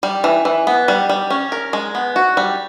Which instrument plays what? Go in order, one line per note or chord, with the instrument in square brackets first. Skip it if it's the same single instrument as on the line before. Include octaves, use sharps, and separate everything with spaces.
[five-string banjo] G3
E3
E3
B3
G3
G3
C#4
A#4
G#3
B3
F#4
G3